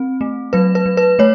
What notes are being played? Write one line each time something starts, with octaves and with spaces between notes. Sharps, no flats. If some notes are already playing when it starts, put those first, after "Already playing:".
Already playing: C4
A3
F#3 B4
B4
F#3
B4
A3 C#5